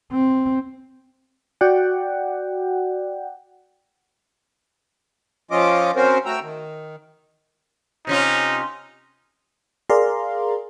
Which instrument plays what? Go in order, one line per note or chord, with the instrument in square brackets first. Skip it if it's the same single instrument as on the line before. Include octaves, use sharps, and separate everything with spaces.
[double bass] C4
[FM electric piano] F#4 D5 F#5 G5
[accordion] F3 C#4 F4 D#5 D6
C4 C#4 F#4 A#4 C5
A3 F#4 G5 A#5 E6
D#3
[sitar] C3 C#4 F4 [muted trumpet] D#4
[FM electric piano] G#4 A#4 D5 F5 A#5 C6